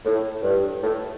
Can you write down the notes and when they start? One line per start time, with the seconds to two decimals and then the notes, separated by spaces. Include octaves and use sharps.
0.05 A2
0.43 G2
0.82 A2